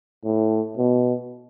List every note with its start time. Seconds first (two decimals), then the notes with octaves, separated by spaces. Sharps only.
0.25 A2
0.77 B2